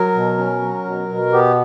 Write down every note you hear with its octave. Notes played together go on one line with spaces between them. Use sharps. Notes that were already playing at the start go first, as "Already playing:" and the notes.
Already playing: F#3 A#4
B2
C#4
F#3
B2
B2
B3 G4